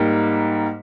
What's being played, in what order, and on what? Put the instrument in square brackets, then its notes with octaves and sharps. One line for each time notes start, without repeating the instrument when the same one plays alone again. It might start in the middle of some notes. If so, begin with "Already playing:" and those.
Already playing: [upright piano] G#2 G3 A#3